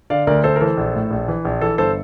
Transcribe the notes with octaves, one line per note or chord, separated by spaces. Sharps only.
D3 D5 F5
D2 A#4 D5
D2 A4 C5
A#4
E3 A4 C5
A#1
A2
A#1
E3
A#1
E3 A4
G1 A4 C5